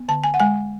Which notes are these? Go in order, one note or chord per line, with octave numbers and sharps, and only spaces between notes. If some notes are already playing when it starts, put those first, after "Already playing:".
Already playing: B3
D3 A5
G#5
F#5
G#3 G#5